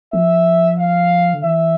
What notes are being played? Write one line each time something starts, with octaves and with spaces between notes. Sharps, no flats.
F3 E5
F5
D3
E3 E5